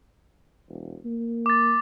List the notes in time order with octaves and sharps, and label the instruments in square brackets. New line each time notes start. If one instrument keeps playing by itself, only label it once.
[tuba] E1
A#3
[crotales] D6 A6